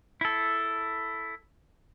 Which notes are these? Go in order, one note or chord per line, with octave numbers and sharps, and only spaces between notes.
E4 A4